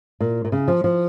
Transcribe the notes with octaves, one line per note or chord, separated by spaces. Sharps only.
A#2
A#2
C#3
F3
F3